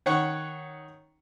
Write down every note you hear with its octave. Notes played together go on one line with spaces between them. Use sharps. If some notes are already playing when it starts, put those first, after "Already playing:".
D#3 C#5 F#5 C#6